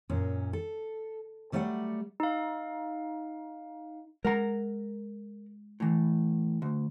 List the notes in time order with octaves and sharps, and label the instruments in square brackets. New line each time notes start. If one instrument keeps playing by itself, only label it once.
[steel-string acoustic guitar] F#2 A#2 C#4
A4
F#3 G3 A3 B4 D5 F#5
[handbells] D#4 F5
[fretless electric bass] G#3 [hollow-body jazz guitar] A#4 F#5 A#5
[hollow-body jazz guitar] A2 E3
D2